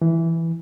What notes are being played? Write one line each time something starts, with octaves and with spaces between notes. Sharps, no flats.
E3